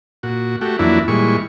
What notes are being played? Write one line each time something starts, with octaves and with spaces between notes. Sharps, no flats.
A#2 F#4
A3 F#4 G4
F2 E3 F#3 A#3 D4 E4
A#2 E3 G3 G#3 C#6